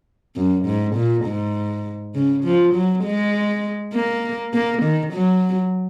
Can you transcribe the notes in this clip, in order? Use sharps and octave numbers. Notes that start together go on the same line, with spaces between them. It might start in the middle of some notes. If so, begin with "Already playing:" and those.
F#2
G#2
A#2
G#2
C#3
F3
F#3
G#3
A#3
A#3
D#3
F#3